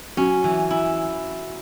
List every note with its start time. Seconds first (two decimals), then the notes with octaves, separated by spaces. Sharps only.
0.17 F#3 C#4
0.44 E3
0.70 E4